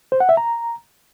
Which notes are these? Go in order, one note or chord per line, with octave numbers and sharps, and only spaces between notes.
C5
F#5
E5
A#5